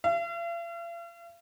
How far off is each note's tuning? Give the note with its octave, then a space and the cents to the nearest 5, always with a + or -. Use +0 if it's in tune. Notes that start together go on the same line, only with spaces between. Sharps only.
F5 -45